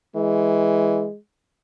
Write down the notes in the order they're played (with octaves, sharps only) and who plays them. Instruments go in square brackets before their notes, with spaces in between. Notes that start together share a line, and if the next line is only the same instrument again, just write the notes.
[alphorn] E3 [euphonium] G#3